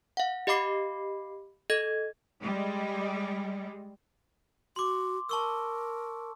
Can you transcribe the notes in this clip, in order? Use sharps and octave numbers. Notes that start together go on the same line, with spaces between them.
F5 F#5
G4 D#5 F5 B5 D6 C7
A4 D#5 G#6
G3 G#3
F#4 C6 D6
A#4 A5 C#6 E6